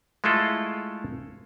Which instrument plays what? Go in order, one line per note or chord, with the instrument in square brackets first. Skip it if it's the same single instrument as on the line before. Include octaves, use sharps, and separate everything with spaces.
[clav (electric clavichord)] G#3 A3 E4 F4 A4